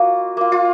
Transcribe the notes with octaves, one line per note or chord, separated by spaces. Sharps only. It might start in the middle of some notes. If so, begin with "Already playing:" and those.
Already playing: A#3 D#4 F4 F#4
A#3 F4
F4